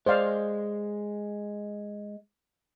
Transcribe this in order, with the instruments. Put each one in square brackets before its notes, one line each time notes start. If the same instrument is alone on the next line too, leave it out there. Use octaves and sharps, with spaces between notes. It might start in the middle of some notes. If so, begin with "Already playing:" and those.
[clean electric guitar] G#3 [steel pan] C5 D5 F5